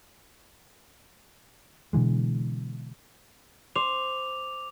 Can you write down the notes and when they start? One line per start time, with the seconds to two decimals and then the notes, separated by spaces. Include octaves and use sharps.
1.93 B2 D3 E3 G#3
3.76 C5 D6 F7